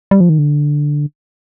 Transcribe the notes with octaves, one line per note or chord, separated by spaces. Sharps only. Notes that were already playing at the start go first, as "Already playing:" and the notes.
G3
F3
D#3
D3